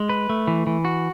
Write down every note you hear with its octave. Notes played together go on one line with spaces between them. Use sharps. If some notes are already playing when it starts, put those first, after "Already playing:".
Already playing: G#3
B4
A3
E3
E3
F#4